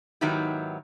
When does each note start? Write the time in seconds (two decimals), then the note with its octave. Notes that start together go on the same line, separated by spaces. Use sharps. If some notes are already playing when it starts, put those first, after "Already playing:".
0.21 G#2 D#3 F#3 B3 E4 G4